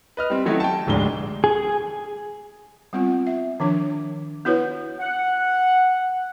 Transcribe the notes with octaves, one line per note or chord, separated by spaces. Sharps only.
B4 D#5 F6
G3 C4
D#3 F#3 A3 C#4 D#4 E4
G5 A5
F1 D2 G#2 G#3 D4 G7
G#4
G3 B3 C4 F4
E5
D#3 F3 D4 C#5
B3 E4 F#4 B4 C#5
F#5